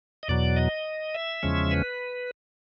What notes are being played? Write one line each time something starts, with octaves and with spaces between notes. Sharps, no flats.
D#5
E2 B2 F#3 D5
D#5
E5
E2 C#3 F3 G#3 C#4
B4